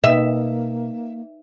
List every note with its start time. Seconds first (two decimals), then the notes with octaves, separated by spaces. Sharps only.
0.04 B2 A#3 D#4 B4 D#5 E5